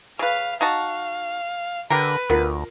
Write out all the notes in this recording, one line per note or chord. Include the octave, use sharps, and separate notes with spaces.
C#3 B4 F5
D#4 F#4 F5 A5
D3 G4 A#4 B4
D2 B3 F4 A#4